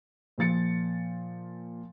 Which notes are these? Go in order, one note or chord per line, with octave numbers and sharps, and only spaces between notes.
A#2 F3 A6 C#7